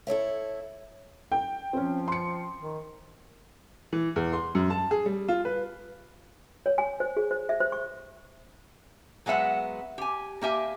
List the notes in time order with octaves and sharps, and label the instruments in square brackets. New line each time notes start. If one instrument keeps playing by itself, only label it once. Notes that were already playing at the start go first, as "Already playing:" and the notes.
[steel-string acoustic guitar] E4 A4 C#5 E5
[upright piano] G5
[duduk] F3 [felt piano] C4 C#4
[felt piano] C6 C#7
[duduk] D#3
[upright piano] E3
E2
C6
F#2
A5
G#4
G3
F4
B4
[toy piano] C#5
G#5
C5
G#4
C5
E5
C5
C#6
[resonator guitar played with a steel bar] F#3 G#3 B3 E5 F#5
G4 G#5
A#3 G4 E5 G#5